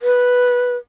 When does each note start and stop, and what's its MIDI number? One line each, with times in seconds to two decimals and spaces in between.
0.02 0.76 71